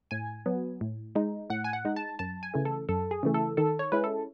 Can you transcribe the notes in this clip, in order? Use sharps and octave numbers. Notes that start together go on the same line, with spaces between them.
A2 G#5
F#3 B3
A2
G#3 D#4
A2 F#5
G#5
F#5
G#3 D#4
A5
F#2 A5
G#5
C#3 E3 A3
A4
F#2 A4
G#4
C#3 E3 A3
A4
D#3 A4
C#5
G#3 C#4 E4 B4
A4